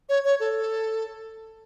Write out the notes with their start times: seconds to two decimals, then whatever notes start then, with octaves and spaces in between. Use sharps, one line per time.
0.09 C#5
0.24 C#5
0.40 A4